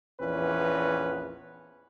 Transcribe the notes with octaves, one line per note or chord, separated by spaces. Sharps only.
A#1 E2 E3 C#4 B4